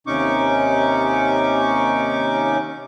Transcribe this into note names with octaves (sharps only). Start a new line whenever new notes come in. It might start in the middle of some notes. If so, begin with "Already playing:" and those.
D#2 C3 C#4 D#4 C#6 D6